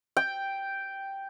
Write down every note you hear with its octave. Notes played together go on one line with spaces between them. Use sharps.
G5